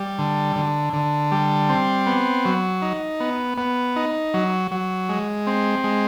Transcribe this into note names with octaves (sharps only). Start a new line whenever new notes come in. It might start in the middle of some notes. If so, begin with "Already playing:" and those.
Already playing: G3
D3
D3
D3
G3
C4
B3
F#3
D#4
B3
B3
D#4
F#3
F#3
G#3
C4
G#3